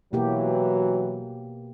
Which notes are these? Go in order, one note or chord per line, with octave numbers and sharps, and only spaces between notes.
B2 E3 F#3 A#3 G4